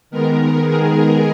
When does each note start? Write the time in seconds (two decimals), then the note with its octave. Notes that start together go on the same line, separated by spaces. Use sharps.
0.11 D#3 G#3 B3 A#4
0.66 G#4